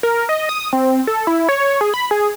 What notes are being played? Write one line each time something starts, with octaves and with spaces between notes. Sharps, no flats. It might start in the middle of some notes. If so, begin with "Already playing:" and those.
A#4
D#5
D#6
C4
A4
E4
C#5
G#4
B5
G#4